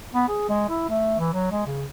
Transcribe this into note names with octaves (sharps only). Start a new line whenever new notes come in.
B3
G#4
G#3
E4
A3
E3
F#3
G#3
C#3